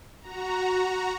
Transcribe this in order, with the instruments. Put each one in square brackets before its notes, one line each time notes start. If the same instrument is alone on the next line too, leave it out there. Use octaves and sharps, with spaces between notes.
[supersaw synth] F#4 A#5